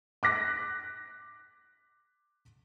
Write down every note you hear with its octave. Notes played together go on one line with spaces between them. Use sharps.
D6 F#6 A#6 B6